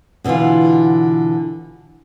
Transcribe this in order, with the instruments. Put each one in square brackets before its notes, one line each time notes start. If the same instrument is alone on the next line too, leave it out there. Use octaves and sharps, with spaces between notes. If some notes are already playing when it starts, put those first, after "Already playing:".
[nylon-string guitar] B2 D3 E3 E4 F4